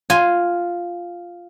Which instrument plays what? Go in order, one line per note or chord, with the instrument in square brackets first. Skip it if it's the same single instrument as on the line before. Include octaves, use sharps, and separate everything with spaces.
[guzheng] F4 G#5